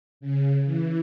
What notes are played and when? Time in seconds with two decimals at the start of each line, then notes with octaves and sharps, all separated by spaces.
0.20 C#3
0.65 E3